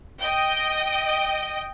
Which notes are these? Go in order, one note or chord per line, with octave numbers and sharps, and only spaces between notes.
D#5 G5